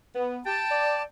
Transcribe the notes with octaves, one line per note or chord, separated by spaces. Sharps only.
B3
G4 G5 A5
D5